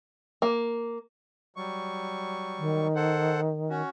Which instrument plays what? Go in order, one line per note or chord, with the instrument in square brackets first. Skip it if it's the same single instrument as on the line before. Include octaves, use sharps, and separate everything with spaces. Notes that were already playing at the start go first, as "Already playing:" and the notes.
[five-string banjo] A#3
[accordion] F#3 G3 C#6
[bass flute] D#3
[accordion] A4 C5 F#5
C#4 F#4